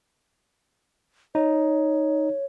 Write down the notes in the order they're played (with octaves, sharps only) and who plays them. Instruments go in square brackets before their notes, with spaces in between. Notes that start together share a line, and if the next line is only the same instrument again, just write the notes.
[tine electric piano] D#4 [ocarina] C#5